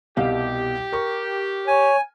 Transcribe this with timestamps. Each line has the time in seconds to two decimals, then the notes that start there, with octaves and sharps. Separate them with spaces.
0.17 C2 B2 G4 F5
0.93 A#4 C#6
1.67 C#5 G#5